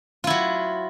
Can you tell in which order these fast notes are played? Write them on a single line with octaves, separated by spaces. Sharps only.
F4 E4 F#3